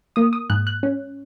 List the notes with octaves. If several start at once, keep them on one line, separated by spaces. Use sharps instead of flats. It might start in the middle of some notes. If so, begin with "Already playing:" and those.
A#3 D#6
D#6
G#2 F#6
F#6
C#4